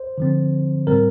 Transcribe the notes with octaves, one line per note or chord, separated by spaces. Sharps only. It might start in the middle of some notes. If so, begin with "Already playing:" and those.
Already playing: C5
D3 F3 C4
A2 G3 C4 A#4